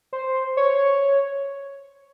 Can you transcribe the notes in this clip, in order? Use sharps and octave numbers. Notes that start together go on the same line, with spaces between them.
C5
C#5